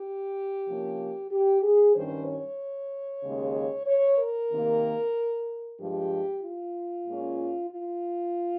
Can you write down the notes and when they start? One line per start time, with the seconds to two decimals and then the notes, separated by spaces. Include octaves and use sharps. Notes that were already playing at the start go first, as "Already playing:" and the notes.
Already playing: G4
0.67 C3 F3 A#3 C#4
1.32 G4
1.63 G#4
1.95 G2 D#3 G3 C#4 C5
2.27 C#5
3.23 D#2 C#3 G#3
3.87 C#5
4.18 A#4
4.51 C3 D#3 A#3
5.79 G2 F3 G#3 G4
6.42 F4
7.06 A#2 G#3 C#4
7.71 F4